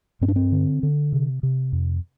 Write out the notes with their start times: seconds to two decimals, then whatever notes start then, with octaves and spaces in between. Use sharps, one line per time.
0.21 G2 C4
0.28 D4
0.36 C4
0.52 D3
0.83 D3
1.12 C3
1.43 C3
1.72 F2